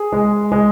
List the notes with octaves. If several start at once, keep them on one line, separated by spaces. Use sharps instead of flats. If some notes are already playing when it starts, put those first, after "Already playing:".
Already playing: G#4
G#3
G#3